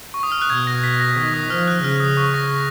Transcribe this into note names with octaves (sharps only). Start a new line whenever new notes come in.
C#6
D#6
F6
F#6
B2 G#6
A#6
B6
A#6
D#3 C#6
D#6
F3 F6
F#6
C#3 F6
D#6
C#6
A#6